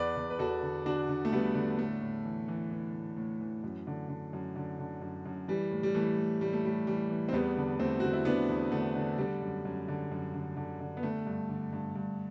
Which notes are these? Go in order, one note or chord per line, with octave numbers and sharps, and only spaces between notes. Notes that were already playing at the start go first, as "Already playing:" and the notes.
Already playing: E2 B4 D5
E2
B4
E2 F#4 A4
D3
D3 D4 F#4
D3
A3
D3 G3 B3
D3
A2 A3
A2
E3
E3
E3
A2
A2
E3
F#2
D3
D3
F#2
D3
D3
F#2
F#2
E3 G3
A2
G3
E3 A3
A2
A2 G3
A3
A2 G3
E3 G3
E3
C4
E2 G3 B3
D3
E2 A3 C4
D3 F#4
E4
D3 B3 D4
E2
D3 A3
D3
D3 G3
F#2
F#2
D3
F#2
D3
D3
D3
B3
D3 A3
G2
D3
G2
G2